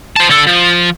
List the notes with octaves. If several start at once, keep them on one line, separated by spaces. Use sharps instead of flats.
C5 A5
D3 A4
F3